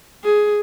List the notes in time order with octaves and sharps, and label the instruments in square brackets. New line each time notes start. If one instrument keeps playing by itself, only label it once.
[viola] G#4